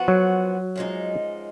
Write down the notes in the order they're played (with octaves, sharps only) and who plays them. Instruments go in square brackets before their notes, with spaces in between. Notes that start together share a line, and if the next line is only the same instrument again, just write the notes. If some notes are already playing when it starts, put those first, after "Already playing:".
Already playing: [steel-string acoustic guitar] F3 B3 F#4
[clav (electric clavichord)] F#3
[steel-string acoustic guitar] F#2 F3 G#3 D#4